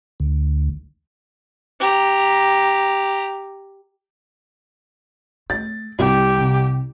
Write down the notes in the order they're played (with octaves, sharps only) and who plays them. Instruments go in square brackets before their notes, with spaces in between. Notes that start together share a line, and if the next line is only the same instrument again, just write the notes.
[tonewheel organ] D2
[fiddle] G4 A#5
[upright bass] A3 [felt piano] A6
[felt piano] C2 [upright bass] G3 [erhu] G4
[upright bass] C3